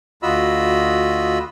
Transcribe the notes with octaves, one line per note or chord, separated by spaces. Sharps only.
D2 F4 F#4 D#5 B5 E6